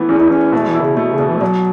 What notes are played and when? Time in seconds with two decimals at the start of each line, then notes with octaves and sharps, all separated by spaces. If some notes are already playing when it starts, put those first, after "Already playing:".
Already playing: E3 A3 B3
0.09 E2 C#4
0.20 E4
0.30 E2 C#4
0.52 B2 A3
0.67 E3
0.74 E4
0.83 C#3
0.97 B2 A3
1.12 C#3
1.19 B2
1.27 E3
1.36 A3
1.41 B2 F#3